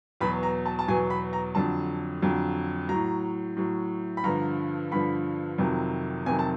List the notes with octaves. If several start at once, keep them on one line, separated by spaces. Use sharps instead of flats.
E2 B2 F#3 B5
A#5
A5
A5
E2 B2 F#3 G#5
B5
A#5
F2 D3 F#3 A5
F2 D3 F#3
F#3 A#5
A2
A2 F#3
B5
G2 D3 F3 A#5
G2 D3 F3 B5
F2 C3 D#3 F#3
F2 C3 D#3 F#3 G#5
A5